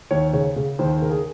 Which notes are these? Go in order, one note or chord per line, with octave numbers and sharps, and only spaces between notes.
D#2 C#5
C#3 C#5
C#3
D#2 C5
C#3 A#4
G#4